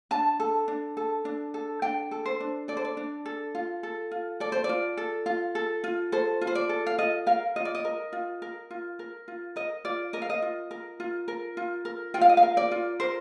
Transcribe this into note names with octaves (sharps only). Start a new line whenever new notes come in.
D4 A5
A4
D4
A4
D4
A4
D4 G5
A4
C5
D4
A4 D5
C5
D5
D4
A4
F4
A4
F4
A4 D5
C5
D5
F4
A4
F4
A4
F4
A4 C5
F4
C5
D5
A4
F5
F4 D#5
A#4 F5
F4 D#5
D5
D#5
A#4
F4
A#4
F4
A#4
F4
A#4 D#5
F4 D5
A#4 D#5
F5
D#5
F4
A#4
F4
A#4
F4
A#4
F4 G5
F5
D#5
F5
A#4
D5
F4
A#4 C5